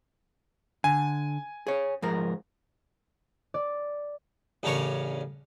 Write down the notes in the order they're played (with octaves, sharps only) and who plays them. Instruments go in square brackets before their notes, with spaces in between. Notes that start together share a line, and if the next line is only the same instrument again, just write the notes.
[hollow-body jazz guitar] D3 [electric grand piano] G#5
[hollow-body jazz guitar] G#4 C#5
G#2 F3 A#4
[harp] D5
[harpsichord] A1 C#3 D4 A#4 C#5 C#6